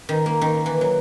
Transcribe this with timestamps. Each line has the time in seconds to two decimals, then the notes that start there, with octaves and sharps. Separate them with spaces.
0.09 D#3
0.26 A#3
0.41 D#3
0.66 E3
0.81 F#3